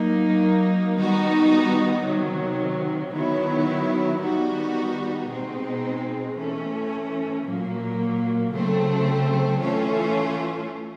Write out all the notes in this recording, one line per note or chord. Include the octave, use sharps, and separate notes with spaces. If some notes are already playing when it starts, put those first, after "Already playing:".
Already playing: F#3 A#3 D#4
D#3 G3 B3 D#4 F#4
C3 D#3 F#3
D#3 F#3 B3 E4
D#3 G3 B3 D#4 F#4
B2 G#3 C4 D#4
E3 A3 C#4
A#2 F#3 A#3
C#3 F#3 A3 C4
E3 A3 C#4 F4